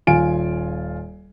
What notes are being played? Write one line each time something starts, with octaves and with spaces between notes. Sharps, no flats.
D#1 F4 G#5 D7